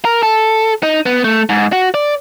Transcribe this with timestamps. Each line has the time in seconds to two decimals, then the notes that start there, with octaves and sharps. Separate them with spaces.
0.05 A#4
0.23 A4
0.83 D#4
1.06 B3
1.24 A3
1.49 G#2
1.72 F#4
1.94 D5